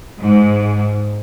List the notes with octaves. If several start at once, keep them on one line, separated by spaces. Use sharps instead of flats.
G#2